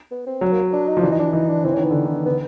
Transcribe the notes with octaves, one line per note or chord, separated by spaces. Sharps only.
B3
C4
F#3 C#4
A#3
D4
D#4
F3
E3 D4
D#4
D4
E3 D#4
D4
E3 C4
D#3 C#4
B3
D3
D#3
D3 B3